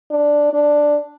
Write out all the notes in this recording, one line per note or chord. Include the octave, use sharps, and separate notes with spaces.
D4
D4